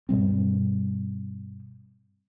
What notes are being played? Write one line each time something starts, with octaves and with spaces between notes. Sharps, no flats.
G2 B2 G3 C4